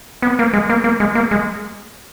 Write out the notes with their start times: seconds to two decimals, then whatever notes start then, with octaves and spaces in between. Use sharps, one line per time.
0.22 B3
0.39 A#3
0.53 G#3
0.69 A#3
0.84 A#3
1.00 G#3
1.15 A#3
1.31 G#3